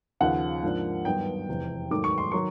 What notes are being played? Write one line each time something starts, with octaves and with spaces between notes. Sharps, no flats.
D#2 C#3 F3 F#5
G#2 F3 A#3 D4
G2 D#3 F#3 B3 D4 G5
F1 E2 C3
G#2 D#3 F#3 A3 D6
C#6
C6
D#3 F#3 C#6